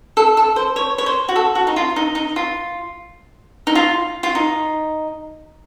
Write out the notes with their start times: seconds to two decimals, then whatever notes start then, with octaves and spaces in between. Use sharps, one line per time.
0.17 A4
0.37 A4
0.56 C5
0.76 C#5
0.98 C#5
1.06 C5
1.29 F#4
1.36 A4
1.55 F#4
1.67 D#4
1.76 F4
1.96 D#4
2.15 D#4
2.36 F4
3.67 D#4
3.75 F4
4.23 F4
4.35 D#4